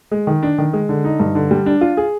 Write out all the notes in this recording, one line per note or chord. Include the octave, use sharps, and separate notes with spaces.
G#3
D#3
D4
D#3
G#3
D3
D#4
G2
D3
G3
D4
F4
G#4